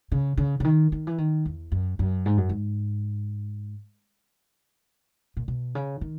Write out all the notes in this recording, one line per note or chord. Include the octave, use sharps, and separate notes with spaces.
C#3
C#3
C#3
D#3
D#3
E3
D#3
E2
F#2
F#2
G#2
F#2
G#2
A#2
B2
C#3
D#3